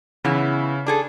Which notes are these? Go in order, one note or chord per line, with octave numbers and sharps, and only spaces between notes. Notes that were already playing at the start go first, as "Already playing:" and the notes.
C#3 E3 B3 E4
D4 G#4 A4